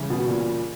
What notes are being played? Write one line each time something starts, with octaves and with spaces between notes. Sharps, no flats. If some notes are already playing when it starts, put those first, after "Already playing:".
Already playing: C#3 E3 G3
B2
A#2